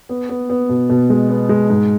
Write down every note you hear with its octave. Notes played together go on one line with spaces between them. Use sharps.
B3
B3
B3
B2
B2
G#3
B3
G#3
G#2